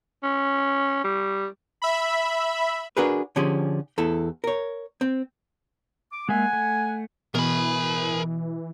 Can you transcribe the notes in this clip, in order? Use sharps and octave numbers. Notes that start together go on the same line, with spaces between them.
C#4
G3
E5 B5
D4 F#4 G#4 A#4 B4
D3 F3 C#4 G4 G#4
E2 E4 A4
A#4 C#5
C4
D6
G#3 A#3 E5 F#5 G#5
A3
B2 E3 G#4 A#4 B5